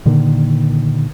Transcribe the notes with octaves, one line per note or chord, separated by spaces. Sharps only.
A#2 D3 D#3 A#3